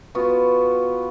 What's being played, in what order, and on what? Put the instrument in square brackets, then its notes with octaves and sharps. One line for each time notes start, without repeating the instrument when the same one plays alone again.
[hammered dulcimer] B3 F4 F#4